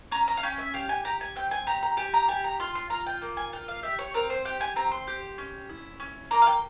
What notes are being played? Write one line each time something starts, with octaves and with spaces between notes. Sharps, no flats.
C#4 A#5
A#5
F5
C#4 G5
E5
G4 F5
G#5
G4 A#5
G#5
C4 G5
G#5
G4 A#5
A#5
G4 G#5
A#5
G4 G#5
A#5
F4 C6
C6
F4 A#5
G5
A#3
G#5
F4 G5
F5
G4 E5
C#5
C4 A#4
C5
G4 G5
G#5
C4 A#5
C6
G4
C#4
E4
C#4
A#3 A#5
F5
G5